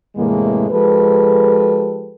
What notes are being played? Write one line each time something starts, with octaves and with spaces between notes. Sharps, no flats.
E2 A2 C3 E3 G#3 A#3
F3 G#3 G4 A4 B4